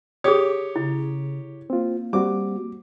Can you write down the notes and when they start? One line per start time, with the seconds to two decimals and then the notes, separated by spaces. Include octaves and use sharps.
0.24 G4 G#4 C#5 D#6
0.76 C#3 E4
1.70 A#3 C4 F4
2.13 G3 C4 F#4 D6